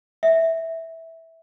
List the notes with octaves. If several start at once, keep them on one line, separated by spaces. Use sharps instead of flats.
E5